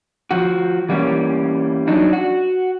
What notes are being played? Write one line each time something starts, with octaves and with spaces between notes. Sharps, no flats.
F3 F#4
E3 G3 A#3 C#4
F#3 D4 D#4
F#4